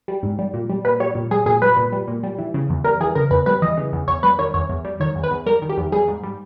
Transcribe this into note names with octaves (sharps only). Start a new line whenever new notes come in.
G3
G#2
G3
A#2
G3
A#2 B4
G3 C#5
A#2
G3 G#4
A#2 G#4
G3 B4
A#2
G3
A#2
G3
E3
C#3
E2
G3 A#4
E3 G#4
C#3 A#4
E2 B4
G3 B4
E3 D#5
C#3
E2
E2 C#5
G3 B4
D#3 C#5
E2 C#5
E2
G3
D#3 C#5
E2
B4
E2
G3 A#4
D#3
G4
E2
G3 G#4
G#2
G3